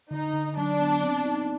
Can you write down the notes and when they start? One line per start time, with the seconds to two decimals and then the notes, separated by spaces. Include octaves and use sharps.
0.11 D3 D#4
0.33 D3
0.57 F#3 D4
0.80 B3
1.03 C4
1.26 D#4